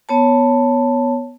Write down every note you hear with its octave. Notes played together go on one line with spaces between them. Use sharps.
B3 C#5 A5